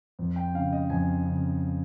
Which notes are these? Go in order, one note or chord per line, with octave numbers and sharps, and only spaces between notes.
F2
G5
C#3 F5
D#5
F2 G#5
C#3